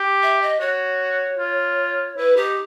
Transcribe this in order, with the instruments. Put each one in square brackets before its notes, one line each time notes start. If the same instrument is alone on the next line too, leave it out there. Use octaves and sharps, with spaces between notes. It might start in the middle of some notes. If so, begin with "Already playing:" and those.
Already playing: [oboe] G4
[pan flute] E5
D#5
[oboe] F#4 [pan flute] C#5
[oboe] F4
[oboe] E4 [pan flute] B4
[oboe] D#4 [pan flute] G4